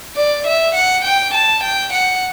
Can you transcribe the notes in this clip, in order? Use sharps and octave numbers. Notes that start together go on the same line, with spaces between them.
D5
E5
F#5
G5
A5
G5
F#5